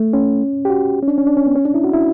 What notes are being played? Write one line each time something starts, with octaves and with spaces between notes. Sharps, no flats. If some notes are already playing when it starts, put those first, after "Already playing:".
Already playing: A3
C#4
G4
F#4
C#4
D4
C#4
D4
C#4
B3
C#4
D4
E4
F#4
E4